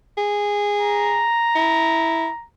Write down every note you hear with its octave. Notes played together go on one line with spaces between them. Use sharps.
G#4
A#5
E4